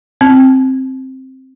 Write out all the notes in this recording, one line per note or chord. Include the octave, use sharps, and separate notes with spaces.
C4